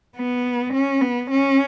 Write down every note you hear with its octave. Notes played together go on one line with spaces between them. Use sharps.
B3
C#4
B3
C#4